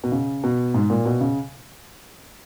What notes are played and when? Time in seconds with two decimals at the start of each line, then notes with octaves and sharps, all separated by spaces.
0.04 B2
0.12 C#3
0.44 B2
0.74 G#2
0.90 A#2
1.06 B2
1.21 C#3